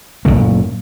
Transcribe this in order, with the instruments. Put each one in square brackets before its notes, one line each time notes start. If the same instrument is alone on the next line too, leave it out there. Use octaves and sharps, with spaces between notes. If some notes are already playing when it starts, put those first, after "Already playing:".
[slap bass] F#1 F2 A#2 A3